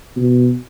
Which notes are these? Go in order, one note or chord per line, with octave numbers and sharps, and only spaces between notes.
B2